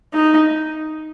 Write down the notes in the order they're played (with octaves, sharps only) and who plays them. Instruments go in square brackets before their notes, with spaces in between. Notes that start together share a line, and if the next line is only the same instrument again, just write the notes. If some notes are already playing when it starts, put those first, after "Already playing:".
[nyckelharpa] D#4